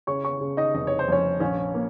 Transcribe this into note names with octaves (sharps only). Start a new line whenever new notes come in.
C#3 C#5 C#6
C#5 C#6
C#3
D#4 D#5
F1 D#5
C#5
C5
F2 C#4 C#5
A#1 C#4 C#5
A#3